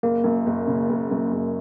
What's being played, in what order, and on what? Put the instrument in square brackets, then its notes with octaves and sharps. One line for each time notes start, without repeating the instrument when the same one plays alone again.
[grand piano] F#1 [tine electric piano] A#3
[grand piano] F#2
F#1
C#3
F#1
F#2
F#1